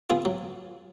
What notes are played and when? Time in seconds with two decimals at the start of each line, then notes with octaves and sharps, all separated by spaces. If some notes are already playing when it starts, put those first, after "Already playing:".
0.10 B3 F4 G#4
0.25 F#3